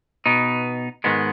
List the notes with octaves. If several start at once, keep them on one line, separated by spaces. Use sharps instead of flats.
B2 B3 D#4
G#2 D#3 G#3 B3